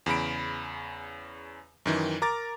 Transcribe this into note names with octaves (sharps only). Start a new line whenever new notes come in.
E2 C#3 B5 D7
F#2 D#3 E3
A#4 A#5 D6 A6